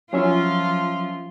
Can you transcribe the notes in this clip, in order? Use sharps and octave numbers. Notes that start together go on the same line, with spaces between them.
F3 F#3 C#4 F4 E5